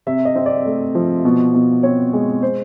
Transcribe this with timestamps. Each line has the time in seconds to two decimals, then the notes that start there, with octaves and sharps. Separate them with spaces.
0.07 C3 E5
0.25 D#5
0.35 C4
0.46 D5
0.66 A3
0.95 F3
1.25 B2
1.54 B2
1.83 C4 C#5
2.13 G#3
2.43 C5